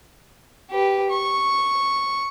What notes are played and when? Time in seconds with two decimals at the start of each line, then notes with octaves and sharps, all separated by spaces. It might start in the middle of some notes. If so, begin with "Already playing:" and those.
0.71 G4 B4
1.10 C#6